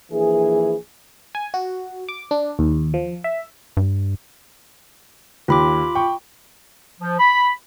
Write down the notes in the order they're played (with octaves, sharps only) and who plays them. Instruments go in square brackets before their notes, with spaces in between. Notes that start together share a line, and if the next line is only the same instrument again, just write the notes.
[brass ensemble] A#1 E3 G#4
[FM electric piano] G#5
F#4
D6
D4
D#2
F3
E5
[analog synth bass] G2
[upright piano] D#2 [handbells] F4 B5 D6
[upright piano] G5 C#6
[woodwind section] F3
B5